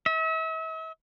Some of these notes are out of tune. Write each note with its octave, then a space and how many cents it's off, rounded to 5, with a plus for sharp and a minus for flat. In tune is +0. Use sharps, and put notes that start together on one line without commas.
E5 -40